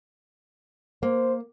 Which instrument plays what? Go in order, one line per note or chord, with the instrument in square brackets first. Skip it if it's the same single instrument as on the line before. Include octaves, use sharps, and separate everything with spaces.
[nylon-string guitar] A#3 [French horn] C5